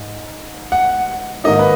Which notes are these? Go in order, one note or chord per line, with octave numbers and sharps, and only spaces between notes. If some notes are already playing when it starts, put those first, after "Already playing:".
Already playing: G#2
F#5
G#2 D#3 A#3 D#4 D#5
B4